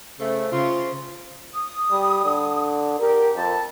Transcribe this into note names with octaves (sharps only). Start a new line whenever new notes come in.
C#3 A3 C5
C#3 F4
D#6
G3
D3
G4 A#4
F2 A5